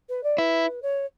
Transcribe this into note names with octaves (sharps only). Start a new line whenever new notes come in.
B4
D5
E4 B4
C#5